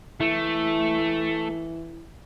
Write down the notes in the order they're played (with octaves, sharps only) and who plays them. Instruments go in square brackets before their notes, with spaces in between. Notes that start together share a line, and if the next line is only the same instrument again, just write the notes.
[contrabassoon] E3 [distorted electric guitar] A3